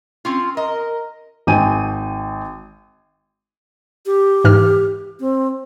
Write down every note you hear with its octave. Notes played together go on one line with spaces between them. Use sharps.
C4 C#4 F4
A#4 D#5
G#1 G5 G#5 D#7
G4
G#2 E3 F6
C4